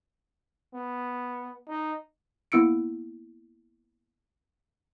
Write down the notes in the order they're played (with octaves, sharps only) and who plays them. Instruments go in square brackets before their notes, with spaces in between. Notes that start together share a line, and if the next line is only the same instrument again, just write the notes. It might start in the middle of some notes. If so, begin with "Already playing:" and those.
[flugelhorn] B3
D#4
[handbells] A#3 B3 E4 E6 C#7 D7